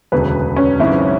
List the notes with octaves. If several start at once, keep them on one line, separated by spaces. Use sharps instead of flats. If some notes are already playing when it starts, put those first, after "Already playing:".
E1 D2 C#3 F#3 B4
C#4
G#1 F#2 C#3 E4